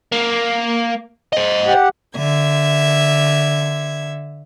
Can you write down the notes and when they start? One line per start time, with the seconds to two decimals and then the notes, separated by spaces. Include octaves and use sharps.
0.12 A#3
1.33 C5 D#5
1.66 G4 F#5
2.15 D3 E5 G#6